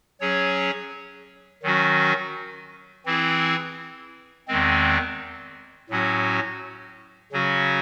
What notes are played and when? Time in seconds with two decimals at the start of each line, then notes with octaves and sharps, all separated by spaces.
0.20 F#3 C#4 G#4 C#5
1.63 D#3 F#3 C#4 F#4
3.06 E3 C4 E4 G#4
4.48 E2 D#3 G#3 C4
5.90 A2 F#3 C#4 F#4
7.32 C#3 F#3 C#4 F#4